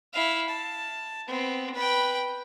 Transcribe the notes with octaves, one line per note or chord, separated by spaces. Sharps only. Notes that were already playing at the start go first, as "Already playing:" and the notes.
E4 F5
A5
B3 C4
B4 G5